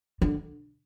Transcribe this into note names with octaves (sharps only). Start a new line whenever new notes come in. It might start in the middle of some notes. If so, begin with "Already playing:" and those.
D3